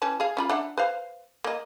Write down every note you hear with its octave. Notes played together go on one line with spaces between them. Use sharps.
E3 C#4 A5
G#4 F5
C#4 F4 B5
D4 E5 F#5
B4 C5 F5
A#3 D#5